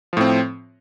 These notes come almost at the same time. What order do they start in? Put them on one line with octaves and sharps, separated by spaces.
F3 A2 C4